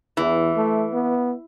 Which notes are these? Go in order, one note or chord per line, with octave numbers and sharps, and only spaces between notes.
E2 E3
A3
B3